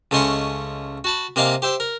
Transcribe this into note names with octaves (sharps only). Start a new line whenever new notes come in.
C#2 A3 C#4 D#5 C6 C#6
F#4 A5 B5
C3 A#3 D#5 F5 G#5
G4 C5 E5 G5
A#4